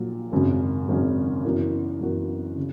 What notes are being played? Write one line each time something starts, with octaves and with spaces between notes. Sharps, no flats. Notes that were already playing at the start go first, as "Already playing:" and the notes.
Already playing: A#1 A#2 F#3
G#1 F#2 C#3 F#3 C#4
G#1 F#2 C#3 F#3 C#4
F#2 E3 B3 F#4 A#4
F#2 E3 B3 F#4 A#4
C#3